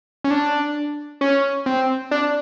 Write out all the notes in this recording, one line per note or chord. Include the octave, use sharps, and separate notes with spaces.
C#4
D4
C#4
C4
D4